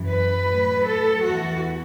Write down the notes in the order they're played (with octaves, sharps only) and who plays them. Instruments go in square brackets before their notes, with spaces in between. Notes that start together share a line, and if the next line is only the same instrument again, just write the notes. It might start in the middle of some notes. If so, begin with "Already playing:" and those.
Already playing: [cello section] F#2 E3
B4
A2 F#3
A4
E2 E3 F#4